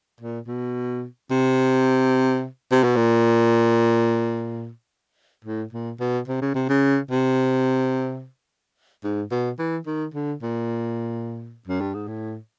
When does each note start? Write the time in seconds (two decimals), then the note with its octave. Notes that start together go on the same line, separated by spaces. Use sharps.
0.20 A#2
0.47 B2
1.31 C3
2.71 C3
2.83 B2
2.96 A#2
5.45 A2
5.72 A#2
6.00 B2
6.28 C3
6.41 C#3
6.55 C3
6.69 C#3
7.11 C3
9.04 G#2
9.31 B2
9.59 E3
9.86 D#3
10.14 D3
10.42 A#2
11.67 F#2
11.81 G2
11.94 G#2
12.08 A2